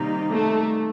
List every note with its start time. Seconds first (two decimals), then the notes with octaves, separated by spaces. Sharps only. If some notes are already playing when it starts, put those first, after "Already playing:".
Already playing: C3 D#3 G3 A#3 D#4
0.32 A3